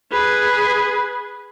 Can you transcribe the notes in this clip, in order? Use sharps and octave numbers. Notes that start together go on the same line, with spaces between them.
G#4 B4